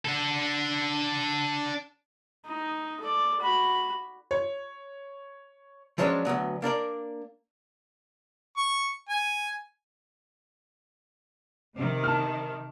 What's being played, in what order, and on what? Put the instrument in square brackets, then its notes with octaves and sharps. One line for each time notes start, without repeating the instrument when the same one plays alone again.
[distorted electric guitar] D4 A4
[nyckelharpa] D#4
A4 D5
F#4 B5
[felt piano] C#5
[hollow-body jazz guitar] F3 F#3 G#3 C#4 D4 C5
D2 G#2 F#3 B3
A#3 D4 A#4 D5
[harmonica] C#6
G#5
[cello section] C3 D#3
[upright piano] A5 F6